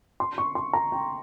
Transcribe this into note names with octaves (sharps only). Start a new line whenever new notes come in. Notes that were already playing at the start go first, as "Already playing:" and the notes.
C6
C#6
C6
A#5
G5